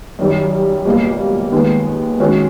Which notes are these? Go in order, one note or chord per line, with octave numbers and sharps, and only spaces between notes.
F#2 D#3 G3
C#2 B2 G3 A#3
D#2 D#3 G#3 B3
D#3 G#3 C#4 F#4